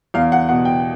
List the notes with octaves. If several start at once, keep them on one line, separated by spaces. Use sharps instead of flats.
E2 F5
F#5
B2 F#5
G5